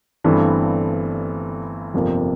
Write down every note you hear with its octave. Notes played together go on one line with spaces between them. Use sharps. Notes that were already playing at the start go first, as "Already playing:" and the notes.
G1 G2 E3 A3 C4
G1 F2 C3 F3 A#3